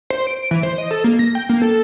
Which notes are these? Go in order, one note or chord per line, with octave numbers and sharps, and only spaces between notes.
C5
D7
E3
C5
D#5
A4
A#3
A#6
G5
A#3
A4